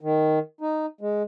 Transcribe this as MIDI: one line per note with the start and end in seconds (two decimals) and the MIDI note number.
0.01 0.39 51
0.61 0.86 63
1.01 1.23 56